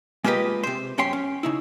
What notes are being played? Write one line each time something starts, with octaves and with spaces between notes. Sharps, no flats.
G#3 A#3 F4 G4 B4 D#5
C3 C5
F#2 C#4 G4 G5 C6
C#4
C#3 D#4 E4